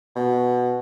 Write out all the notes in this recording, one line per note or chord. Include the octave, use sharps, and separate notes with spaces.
B2